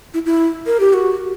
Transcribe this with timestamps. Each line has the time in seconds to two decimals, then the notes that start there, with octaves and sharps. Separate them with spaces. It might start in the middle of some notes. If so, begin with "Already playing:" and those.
0.14 E4
0.26 E4
0.66 A#4
0.80 G4
0.93 F#4